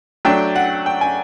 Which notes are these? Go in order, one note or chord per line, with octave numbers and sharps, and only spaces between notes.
F#3 A3 D4 G5
F#5
G5
G#5